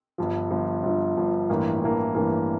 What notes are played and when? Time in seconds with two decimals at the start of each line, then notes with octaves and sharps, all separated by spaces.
0.18 G1 G2 F3
0.50 G1 G2 F3
0.83 G1 G2 F3
1.17 G1 G2 F3
1.49 A1 G2 E3 A#3
1.81 A1 G2 E3 A#3
2.15 A1 G2 E3 A#3